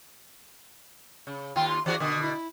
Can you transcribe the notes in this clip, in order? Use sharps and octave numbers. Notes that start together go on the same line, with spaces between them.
C#3
D#2 F4 G5
C6
E3 F#4 G#4 D5
B2 D3 D#6
E4